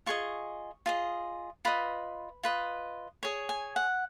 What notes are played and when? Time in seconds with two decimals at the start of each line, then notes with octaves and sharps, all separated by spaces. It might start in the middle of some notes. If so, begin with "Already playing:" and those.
0.06 F4 G#4 D#5 C#6
0.86 F4 G#4 D#5
1.65 F4 B4 D#5 B5
2.43 F4 B4 D#5
3.23 G#4 C#5
3.49 G#5
3.76 F#5